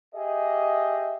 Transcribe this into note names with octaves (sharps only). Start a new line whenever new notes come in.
G4 G#4 D#5 E5